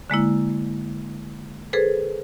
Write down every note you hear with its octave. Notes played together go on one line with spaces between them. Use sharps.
D3 G#3 A#3 E4
G#4 A4 B4 C5